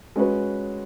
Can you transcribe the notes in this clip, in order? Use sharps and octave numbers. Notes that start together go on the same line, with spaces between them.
G#3 C#4 F#4 B4